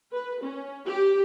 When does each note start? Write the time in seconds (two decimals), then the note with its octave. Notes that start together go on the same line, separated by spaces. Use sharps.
0.13 B4
0.43 C#4
0.87 G4